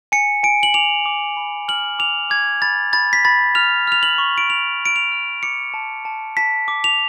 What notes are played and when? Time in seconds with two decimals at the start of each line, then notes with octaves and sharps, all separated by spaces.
0.12 G#5 C#7
0.43 G#5 D7
0.63 F#7
0.74 D6 F7
1.06 D6
1.37 B5
1.68 F6 F#7
1.99 D6 F7
2.30 D6 G#6
2.62 B5 A6
2.93 B5 A6
3.13 B6
3.25 B5 A6
3.55 F6 F7
3.87 F6 F7
4.03 F#7
4.18 C#6
4.38 D7
4.49 C#6 F7
4.81 C#6 D7
4.96 F7
5.12 F6
5.43 D6 C#7
5.74 A5
6.05 A5
6.37 A5 B6
6.68 D6
6.84 F7